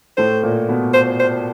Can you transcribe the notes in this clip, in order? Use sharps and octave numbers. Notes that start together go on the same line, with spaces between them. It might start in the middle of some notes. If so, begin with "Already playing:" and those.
A2 A3 C5
A#2 A#3
B2 B3
C5
C5